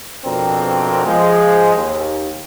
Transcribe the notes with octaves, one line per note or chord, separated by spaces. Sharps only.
F2 B2 C4 D4 A#4
F3 G#3
D#2